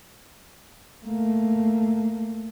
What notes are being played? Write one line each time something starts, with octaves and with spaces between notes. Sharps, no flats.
A3 A#3